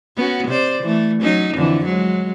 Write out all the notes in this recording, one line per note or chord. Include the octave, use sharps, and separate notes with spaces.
B3 C#4 F#4
C3 C5 D5
E3 A3
F#3 C#4 D#4
F2 D3 E3
F#3 G#3